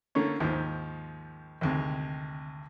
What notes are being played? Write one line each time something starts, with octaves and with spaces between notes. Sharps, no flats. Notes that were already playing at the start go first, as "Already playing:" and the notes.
D3 A3 A#3 C#4
D#2 G#2 F3
G#1 D2 C3